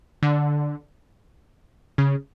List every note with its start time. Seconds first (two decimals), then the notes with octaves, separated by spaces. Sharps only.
0.23 D3
1.98 C#3